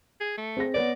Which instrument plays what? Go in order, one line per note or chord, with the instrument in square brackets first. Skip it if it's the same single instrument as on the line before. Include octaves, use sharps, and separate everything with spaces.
[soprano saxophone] G#4
A3
[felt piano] C4 G#4 A#6
[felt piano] B3 B4 C#5 [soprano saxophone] D5